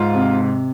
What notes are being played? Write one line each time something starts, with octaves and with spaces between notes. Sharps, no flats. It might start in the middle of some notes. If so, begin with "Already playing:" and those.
Already playing: G#2 F4
C3
C3